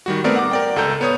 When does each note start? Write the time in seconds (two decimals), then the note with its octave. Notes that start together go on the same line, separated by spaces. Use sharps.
0.06 D#3 G3 F#4
0.24 A3 B3 C4 A#4 D5
0.36 F#5 D6
0.51 A#4 D5 G5
0.76 C#2 A4 A#5 G6
1.01 B3 C#5 D#6